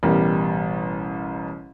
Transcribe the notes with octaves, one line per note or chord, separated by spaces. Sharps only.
A1 B2 G3 A#4